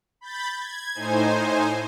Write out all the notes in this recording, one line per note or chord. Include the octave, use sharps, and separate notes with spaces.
B5 G6 A6
G#6
A2 D#4 C5 G#5